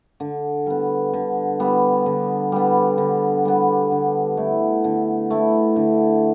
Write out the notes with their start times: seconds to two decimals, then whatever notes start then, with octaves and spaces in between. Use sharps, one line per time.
0.20 D3
0.66 G3 B3
1.14 D3
1.60 G3 B3
2.06 D3
2.52 G3 B3
2.98 D3
3.45 G3 B3
3.91 D3
4.37 A3 E4
4.84 D3
5.30 A3 E4
5.76 D3